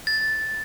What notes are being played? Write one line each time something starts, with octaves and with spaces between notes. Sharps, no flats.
A6